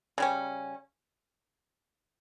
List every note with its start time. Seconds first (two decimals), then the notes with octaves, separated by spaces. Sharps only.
0.18 C#3 G3 C#4